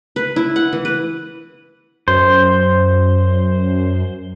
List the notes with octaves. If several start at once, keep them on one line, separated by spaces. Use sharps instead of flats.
B4
E4
F#5
E3
B4
F#2 C5